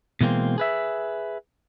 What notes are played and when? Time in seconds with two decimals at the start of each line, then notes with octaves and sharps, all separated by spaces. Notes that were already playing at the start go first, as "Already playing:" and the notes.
0.21 B2 E3 G#3 A#3 C4
0.58 G#4 B4 E5